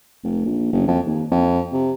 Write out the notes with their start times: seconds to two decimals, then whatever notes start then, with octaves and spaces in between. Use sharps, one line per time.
0.24 F1
0.46 A#1
0.73 F#1
0.88 F2
1.06 D#2
1.31 F2
1.73 C3